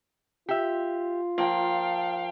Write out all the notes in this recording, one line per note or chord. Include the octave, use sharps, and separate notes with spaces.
F4 G4 E5
F3 A#3 F5 G5